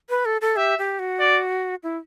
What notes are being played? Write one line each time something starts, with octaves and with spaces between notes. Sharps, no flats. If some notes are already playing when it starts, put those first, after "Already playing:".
B4
A4
A4
G4 E5
G4
F#4
D5
E4